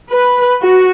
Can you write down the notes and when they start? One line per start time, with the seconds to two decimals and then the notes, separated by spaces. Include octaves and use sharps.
0.10 B4
0.60 F#4